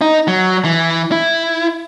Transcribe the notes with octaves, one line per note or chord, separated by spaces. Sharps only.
D#4
F#3
E3
E4